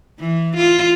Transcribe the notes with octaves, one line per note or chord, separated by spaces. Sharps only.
E3
F4